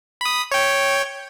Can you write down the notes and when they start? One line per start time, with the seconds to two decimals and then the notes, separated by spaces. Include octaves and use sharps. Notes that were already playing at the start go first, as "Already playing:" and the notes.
0.21 B5 D#6
0.51 C#5 G5